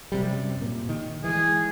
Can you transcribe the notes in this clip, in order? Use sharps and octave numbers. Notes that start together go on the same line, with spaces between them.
F#2 C3 G3
A#2
D#3
E3 G#3 G#4